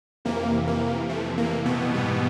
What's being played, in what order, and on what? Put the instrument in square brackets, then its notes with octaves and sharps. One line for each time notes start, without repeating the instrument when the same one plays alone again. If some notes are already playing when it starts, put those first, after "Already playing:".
[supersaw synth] F2 C3 E3 A#3
A#3
A3
A#3
B2 B3
G#2 E3 G3